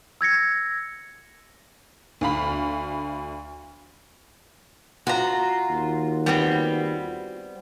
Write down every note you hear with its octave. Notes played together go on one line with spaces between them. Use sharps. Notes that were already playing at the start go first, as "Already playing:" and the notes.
E6 G#6 A#6 C#7
D2 F5 B5
F4 F#4 A#5
D#2
G3 B3 C4